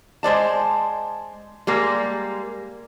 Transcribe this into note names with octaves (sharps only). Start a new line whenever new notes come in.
G#3 C5 D5 A5
G3 G#3 A#3